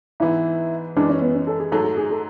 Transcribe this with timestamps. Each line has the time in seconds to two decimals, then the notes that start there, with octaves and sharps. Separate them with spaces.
0.20 G#2 E3 B3 E4
0.96 F#2 E3 G#3 D4
1.09 C#4
1.21 B3
1.35 C#4
1.47 A4
1.60 G#4
1.72 G#2 F#3 A3 A4
1.84 A4
1.97 G#4
2.10 A4